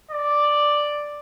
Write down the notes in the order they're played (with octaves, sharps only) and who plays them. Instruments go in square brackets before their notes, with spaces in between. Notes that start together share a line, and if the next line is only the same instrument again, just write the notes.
[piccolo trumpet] D5